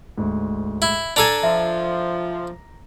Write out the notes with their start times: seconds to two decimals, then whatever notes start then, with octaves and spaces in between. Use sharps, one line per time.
0.18 D2 G#2
0.82 E4
1.16 D4 A4 G#5 A#5 D6 F7
1.43 F3 E5